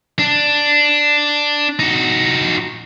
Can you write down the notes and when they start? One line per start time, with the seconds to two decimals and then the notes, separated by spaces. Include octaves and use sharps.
0.19 D4
1.79 D#4 F#4